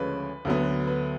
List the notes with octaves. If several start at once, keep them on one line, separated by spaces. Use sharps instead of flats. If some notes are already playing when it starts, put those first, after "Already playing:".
Already playing: D2 C#3 F3 G#3 C#4 B4
D2 D3 F#3 B3
B4